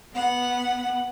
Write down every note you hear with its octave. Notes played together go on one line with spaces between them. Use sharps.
B3 F#5